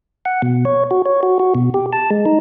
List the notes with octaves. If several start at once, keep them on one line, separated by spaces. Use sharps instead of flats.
F#5
B2
C#5
F#4
C#5
F#4
F#4
B2
G4
A5
G#3
D#4